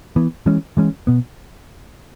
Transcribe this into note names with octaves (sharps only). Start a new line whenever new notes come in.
E3 B3
E3 G#3 C#4
E3 G#3 C#4
B2 B3